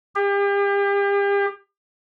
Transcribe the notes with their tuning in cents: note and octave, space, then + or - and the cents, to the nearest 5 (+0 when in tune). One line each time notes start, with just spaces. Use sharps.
G4 +40